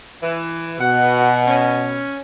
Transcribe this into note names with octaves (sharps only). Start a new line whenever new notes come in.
E3
B2 F#5
C#4